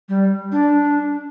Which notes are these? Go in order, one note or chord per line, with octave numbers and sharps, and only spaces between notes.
G3
D4